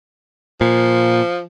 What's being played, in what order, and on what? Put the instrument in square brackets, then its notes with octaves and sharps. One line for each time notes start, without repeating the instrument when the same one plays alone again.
[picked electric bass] A#2 [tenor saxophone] F3